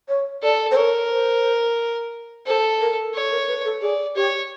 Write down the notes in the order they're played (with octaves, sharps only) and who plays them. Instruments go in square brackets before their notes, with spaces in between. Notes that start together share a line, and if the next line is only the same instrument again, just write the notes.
[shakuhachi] C#5
[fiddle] A4 [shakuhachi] D5
[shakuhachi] C5
[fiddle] A#4 [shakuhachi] C#5
[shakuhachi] C5
[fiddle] A4 [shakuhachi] C5
[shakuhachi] A#4
[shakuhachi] A4 [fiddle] C#5
[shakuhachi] A#4
B4
A4
[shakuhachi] G#4 [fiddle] D5
[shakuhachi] G4 [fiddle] C#5